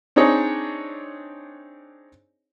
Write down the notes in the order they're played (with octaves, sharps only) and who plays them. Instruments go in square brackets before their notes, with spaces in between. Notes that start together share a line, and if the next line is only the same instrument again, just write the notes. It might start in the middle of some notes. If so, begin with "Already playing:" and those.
[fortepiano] C4 D4 D#4 G#4 C#5 D#5